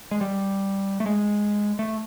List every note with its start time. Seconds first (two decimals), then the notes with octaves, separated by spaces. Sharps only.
0.11 G#3
0.21 G3
1.00 A3
1.06 G#3
1.79 A3